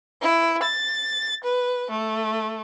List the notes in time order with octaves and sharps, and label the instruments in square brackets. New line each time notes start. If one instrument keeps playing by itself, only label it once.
[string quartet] E4
A6
B4
A3